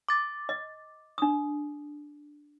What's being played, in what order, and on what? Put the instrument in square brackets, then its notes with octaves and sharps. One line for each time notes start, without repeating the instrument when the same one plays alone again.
[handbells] D6 A6
[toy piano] D#5
D4 D#6